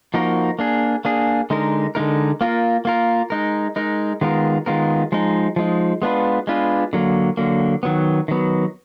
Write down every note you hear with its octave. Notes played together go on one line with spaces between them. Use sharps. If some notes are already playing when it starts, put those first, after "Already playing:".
F3 A#3 D#4 F#4 A#4
A#3 D4 G#4
A#3 D4 G#4
D3 G#3 D#4 A#4
D3 G#3 D#4 A#4
A#3 F4 A#4
A#3 F4 A#4
G#3 D#4 A#4
G#3 D#4 A#4
D#3 G#3 B3 F4 A#4
D#3 G#3 B3 F4 A#4
F3 G#3 D#4
F3 G#3 D#4
G#3 B3 D4 F4 B4
G#3 B3 D4 F4 B4
D3 F#3 A#3
D3 F#3 A#3
D#3 F#3 B3
D#3 F#3 B3